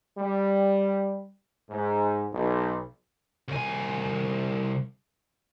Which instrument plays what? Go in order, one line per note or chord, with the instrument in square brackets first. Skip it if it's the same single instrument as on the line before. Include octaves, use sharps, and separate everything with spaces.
[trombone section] G3
G#2
B1
[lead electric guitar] C2 G#5